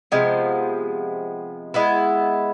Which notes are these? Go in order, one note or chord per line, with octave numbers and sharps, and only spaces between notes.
C3 F3 G#3 B3
G#3 B3 E4